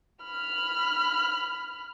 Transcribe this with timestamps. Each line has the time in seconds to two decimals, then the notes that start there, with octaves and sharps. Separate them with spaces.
0.24 B5 F6